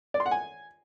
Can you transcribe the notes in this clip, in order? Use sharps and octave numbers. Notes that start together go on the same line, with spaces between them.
D5
C6
F#5
G#5